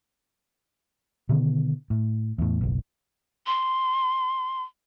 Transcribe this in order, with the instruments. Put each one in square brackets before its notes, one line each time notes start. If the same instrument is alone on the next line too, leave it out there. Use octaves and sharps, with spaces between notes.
[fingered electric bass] B2 D3 D#3 B3
A2
E2 A2
F#1 B1
[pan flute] C6